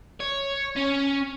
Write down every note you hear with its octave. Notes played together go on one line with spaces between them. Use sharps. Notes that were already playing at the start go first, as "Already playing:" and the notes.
C#5
C#4